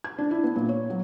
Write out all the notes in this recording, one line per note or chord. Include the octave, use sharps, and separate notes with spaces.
G#6
D4
E4
B3
A#2
C#5
F#3